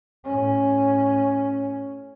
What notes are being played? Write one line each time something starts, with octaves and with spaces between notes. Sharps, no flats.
A2 C#4